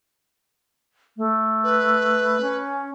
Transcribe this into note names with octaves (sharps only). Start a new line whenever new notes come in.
A3
B4
C#4